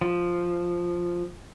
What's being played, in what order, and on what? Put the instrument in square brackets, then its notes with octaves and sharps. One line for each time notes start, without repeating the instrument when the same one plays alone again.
[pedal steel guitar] F3